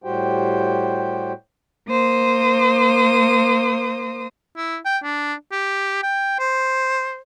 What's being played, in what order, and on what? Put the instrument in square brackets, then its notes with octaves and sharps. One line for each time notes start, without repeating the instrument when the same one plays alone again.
[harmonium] A2 G3 F#4 G4 C5 G5
[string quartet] A#3 C5 D#6
[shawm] E4
G5
D4
G4
G5
C5